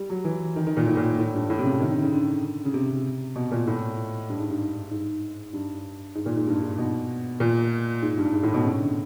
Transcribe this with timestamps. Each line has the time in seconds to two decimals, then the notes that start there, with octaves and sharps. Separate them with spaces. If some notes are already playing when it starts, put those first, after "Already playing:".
Already playing: G3
0.10 F#3
0.25 E3
0.56 D#3
0.67 D#3
0.77 A#2
0.87 A2
0.97 A#2
1.18 A2
1.34 G2
1.50 A2
1.59 C3
1.65 C#3
1.80 D#3
1.91 D3
2.02 C#3
2.13 D3
2.65 C#3
2.74 C3
3.36 B2
3.52 A#2
3.67 A2
4.29 G2
4.40 G#2
4.50 G2
4.91 G#2
5.53 G2
6.15 G#2
6.26 A#2
6.36 G#2
6.47 G2
6.62 G#2
6.78 B2
7.40 A#2
8.02 G#2
8.18 G2
8.33 G#2
8.43 A2
8.54 B2
8.64 C#3
8.80 D3